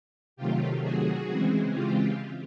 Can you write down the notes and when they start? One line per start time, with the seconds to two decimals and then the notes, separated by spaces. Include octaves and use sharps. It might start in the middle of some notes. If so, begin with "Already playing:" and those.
0.36 C3 D#3 F#3 A3 F4 G4
0.82 F#4 G#4
1.28 C#3 E3 G#3 C4
1.73 F4 G4